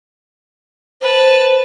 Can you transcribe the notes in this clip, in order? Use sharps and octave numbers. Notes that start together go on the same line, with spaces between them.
B4 C5 A5